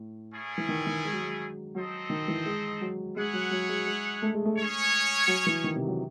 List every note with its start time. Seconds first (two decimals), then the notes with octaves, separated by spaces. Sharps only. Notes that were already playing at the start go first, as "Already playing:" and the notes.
Already playing: A2
0.33 A3 C#4 E4 G#4
0.58 E3
0.69 D#3
0.87 D#3
1.05 G#3
1.13 F#3
1.21 G#3
1.75 F#3 C4 D#4 A4 C5 D#5
2.10 D#3
2.28 E3
2.46 G#3
2.81 F#3
3.16 G#3 E4 G#4 C#5 F#5
3.33 F#3
3.51 F#3
3.69 G#3
3.87 G#3
4.22 A3
4.34 G#3
4.45 A3
4.57 C#4 G#4 C#5
5.28 F#3
5.46 E3
5.64 D#3
5.76 C3
5.87 F#3